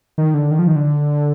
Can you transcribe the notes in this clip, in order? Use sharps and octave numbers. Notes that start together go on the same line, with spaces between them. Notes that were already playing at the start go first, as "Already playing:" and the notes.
D#3
D3
D#3
F3
D#3
D3